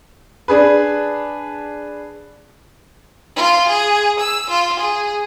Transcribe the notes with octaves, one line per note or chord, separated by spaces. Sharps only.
D4 G#4 B4
F4
G#4
E6
F4
G#4